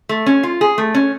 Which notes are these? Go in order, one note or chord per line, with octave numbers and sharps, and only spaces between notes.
A3
C#4
F4
G#4
A3
C#4